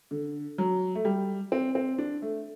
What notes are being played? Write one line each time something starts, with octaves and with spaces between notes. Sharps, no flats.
D3
F#3
A3
G3
C4
C4
D4
A3